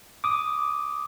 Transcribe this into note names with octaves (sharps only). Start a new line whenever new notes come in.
D6 D#6